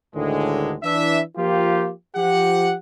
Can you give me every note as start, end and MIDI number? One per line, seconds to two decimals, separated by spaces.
0.15 0.75 38
0.15 0.75 45
0.15 0.75 50
0.15 0.75 51
0.15 0.75 56
0.83 1.21 52
0.83 1.21 62
0.83 1.21 76
1.37 1.90 53
1.37 1.90 58
1.37 1.90 65
1.37 1.90 67
2.16 2.75 53
2.16 2.75 67
2.16 2.75 78